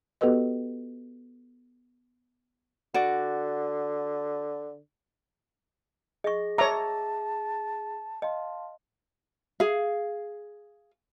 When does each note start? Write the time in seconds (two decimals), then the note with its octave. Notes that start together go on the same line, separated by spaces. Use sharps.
0.21 B3 F#4 G4 A4 B4 D#5
2.94 D3 F#4 D5
6.24 G#4 D#5 C#6 A#6
6.58 C#5 E5 A5 A#5 D6 E6
8.22 D#5 F5 A5 C6
9.60 G#4 F5